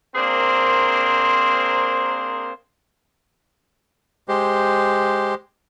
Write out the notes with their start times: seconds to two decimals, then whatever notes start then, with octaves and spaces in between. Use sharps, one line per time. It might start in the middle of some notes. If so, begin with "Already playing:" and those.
0.16 A#3 C4 D4 G#4 A#4 C5
4.28 G#3 G4 C5